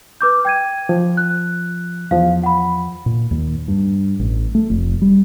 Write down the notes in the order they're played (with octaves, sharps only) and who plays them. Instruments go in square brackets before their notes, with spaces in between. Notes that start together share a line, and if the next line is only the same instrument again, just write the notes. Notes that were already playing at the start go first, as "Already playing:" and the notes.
[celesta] B4 D6 G6
G5 G#6 D#7
[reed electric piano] F3
[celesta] F#6
[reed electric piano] E2 F3 [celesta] F5
[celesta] F#5 B5
[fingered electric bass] A#2
D#2
G2
A1
A3
F1
G3